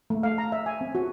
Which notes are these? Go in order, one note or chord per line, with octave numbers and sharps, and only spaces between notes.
A3
F5
A#5
E5
G#5
C4
F#4